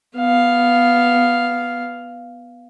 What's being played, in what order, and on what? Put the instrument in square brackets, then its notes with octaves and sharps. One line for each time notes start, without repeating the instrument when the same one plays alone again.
[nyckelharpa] B3 F5